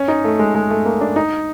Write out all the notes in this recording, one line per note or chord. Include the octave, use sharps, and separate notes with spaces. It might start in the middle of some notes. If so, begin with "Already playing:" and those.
Already playing: C#4
D#4
A3
G#3
G#3
A3
A#3
D4
D#4